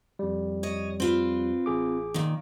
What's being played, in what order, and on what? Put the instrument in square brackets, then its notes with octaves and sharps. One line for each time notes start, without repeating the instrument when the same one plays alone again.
[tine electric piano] F2 G3
[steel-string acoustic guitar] C#5 D#5
C4 F4 B4
[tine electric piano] A1 G#4 D6
[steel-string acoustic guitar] A#2 D#3